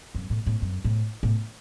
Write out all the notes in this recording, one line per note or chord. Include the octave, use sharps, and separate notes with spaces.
F#2
A2
A2
F#2
A2
A2